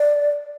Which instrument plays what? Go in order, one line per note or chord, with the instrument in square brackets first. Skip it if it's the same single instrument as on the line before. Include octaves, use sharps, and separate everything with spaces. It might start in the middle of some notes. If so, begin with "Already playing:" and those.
Already playing: [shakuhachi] D5